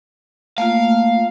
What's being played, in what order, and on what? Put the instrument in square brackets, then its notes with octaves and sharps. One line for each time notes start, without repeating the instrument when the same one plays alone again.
[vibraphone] A3 A#3 F4 [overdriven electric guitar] F5